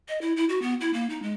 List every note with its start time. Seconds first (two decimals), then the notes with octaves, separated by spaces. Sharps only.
0.08 D#5
0.21 E4
0.36 E4
0.49 F#4
0.62 B3
0.81 E4
0.93 A#3
1.10 D#4
1.23 G#3